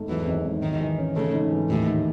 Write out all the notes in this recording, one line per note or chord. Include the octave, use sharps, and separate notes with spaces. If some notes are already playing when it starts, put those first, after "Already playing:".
Already playing: G#1 G#2 A3
E2 E3 F#3
G#1
G#2
G#2 D#3
E3
C#4
C#3 A3
G#2
E3
D#2 A2
D#3